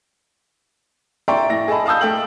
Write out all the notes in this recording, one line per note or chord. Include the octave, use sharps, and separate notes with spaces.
D5 E5 G5 A#5 C6 C#6
A2 E5 A#6
G#4 A4 D#5 A5 B5
F5 A5 D#6 E6 G6
A3 A4 G5 F#7